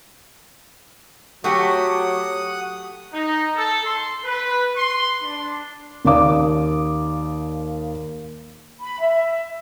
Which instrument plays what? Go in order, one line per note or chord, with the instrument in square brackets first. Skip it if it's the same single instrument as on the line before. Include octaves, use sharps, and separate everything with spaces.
[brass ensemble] F#3 [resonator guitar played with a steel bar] A3 F#4 G4 [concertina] F#5 D#6
[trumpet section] D#4
A4
C6
B4
C6
D4
[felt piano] D#2 D5 F5 D6 D#6
[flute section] B5
E5